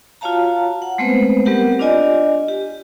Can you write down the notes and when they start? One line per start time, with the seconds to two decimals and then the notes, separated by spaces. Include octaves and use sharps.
0.21 F4 F#4 C#5 F5 A5 A#5
0.82 F#5
0.98 G#3 A3 B3 C4 B4 C5
1.45 G3 B3 C4 G4 A#4 F#5
1.79 D4 F4 G4 D5 D#5 G#5
2.48 G4